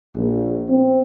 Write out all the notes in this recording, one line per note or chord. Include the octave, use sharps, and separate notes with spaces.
A#1
C4